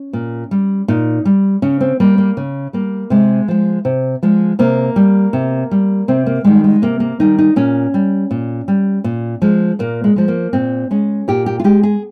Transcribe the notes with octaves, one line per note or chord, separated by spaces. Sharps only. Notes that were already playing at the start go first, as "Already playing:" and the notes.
Already playing: C#4
A#2
G3
A#2 D#4
G3
C#3 C#4
C4
G3 A#3
A#3
C#3
G3 A#3
C3 G#3
F3 G#3
C3
F3 G#3
C3 A#3
G3
C3
G3
C3 C4
A#3
D#3 G3 G#3
G#3
C3 A#3
A#3
D#3 G3 D#4
D#4
A#2 C#4
G3
A#2
G3
A#2
F3 G#3
A#2 A#3
G#3
F3 G#3
A#3
A#2 C4
G#3 C#4
A#2 G4
G4
F4
G#3 G4
G#4